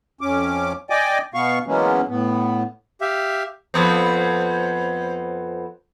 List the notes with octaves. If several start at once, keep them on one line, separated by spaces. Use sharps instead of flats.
F2 C#4 D6
D5 D#5 G5 G#5 D6
B2 B3 F5 C#6
E3 F#3 G#3 A#3 B3 C#4
A2 B3
G4 E5 F5
F2 B3 C4